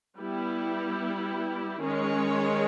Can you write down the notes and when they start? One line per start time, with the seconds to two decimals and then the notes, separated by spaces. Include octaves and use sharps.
0.17 G3 B3 E4 G4
1.82 D#3 G#3 C#4 G#4 C#5